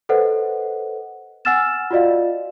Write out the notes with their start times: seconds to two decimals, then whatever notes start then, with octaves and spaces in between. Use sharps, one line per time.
0.09 A4 B4 C5 D#5 F#5
1.45 F#5 G#5 E6 F6 A6 E7
1.91 F4 F#4 D5 D#5 F5